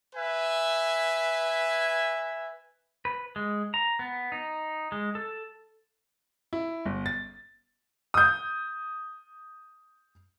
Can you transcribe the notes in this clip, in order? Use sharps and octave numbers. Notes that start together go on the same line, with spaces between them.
B4 E5 G#5
B4
G#3
A#5
B3
D#4
G#3
A4
E4
G1
A6
D#6 G6